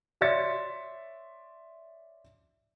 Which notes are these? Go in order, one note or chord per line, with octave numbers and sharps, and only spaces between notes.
C#5 D5 E5 C6 A6 C#7